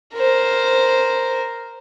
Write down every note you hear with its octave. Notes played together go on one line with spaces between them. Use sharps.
A#4 C5